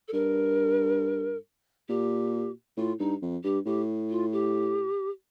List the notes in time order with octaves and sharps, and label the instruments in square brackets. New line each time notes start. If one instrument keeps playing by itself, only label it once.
[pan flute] A4
[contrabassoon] G2 [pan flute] A#4
[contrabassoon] A#2 [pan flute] G4
[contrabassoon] A2 [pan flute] F4
[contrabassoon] G2 [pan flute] D#4
[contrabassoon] F2
[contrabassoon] G2 [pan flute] G4
[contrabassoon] A2 [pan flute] G4
[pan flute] F4
G4